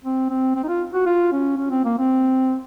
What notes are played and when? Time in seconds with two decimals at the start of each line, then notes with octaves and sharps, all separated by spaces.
0.04 C4
0.30 C4
0.56 C4
0.64 D#4
0.69 F4
0.94 F#4
1.06 F4
1.32 C#4
1.57 C#4
1.71 C4
1.85 A#3
1.98 C4